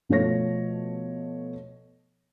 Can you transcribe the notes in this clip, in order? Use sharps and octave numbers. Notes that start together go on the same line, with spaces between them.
B2 F3 A3 C#5 A#6